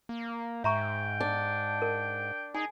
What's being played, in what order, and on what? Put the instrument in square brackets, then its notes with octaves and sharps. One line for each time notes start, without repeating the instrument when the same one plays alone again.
[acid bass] A#3
[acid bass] G#2 [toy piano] E5 A#5 C#6 [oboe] G5
[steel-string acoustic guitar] D4
[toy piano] A#4
[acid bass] D#4 [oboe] G#4 [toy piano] G#5